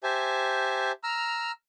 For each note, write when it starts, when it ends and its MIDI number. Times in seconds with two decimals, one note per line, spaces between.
0.03 0.92 67
0.03 0.92 72
0.03 0.92 76
0.03 0.92 80
0.03 0.92 81
1.03 1.52 82
1.03 1.52 88
1.03 1.52 89